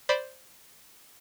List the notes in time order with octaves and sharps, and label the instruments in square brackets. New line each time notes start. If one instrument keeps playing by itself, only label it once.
[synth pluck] C5 D5 B5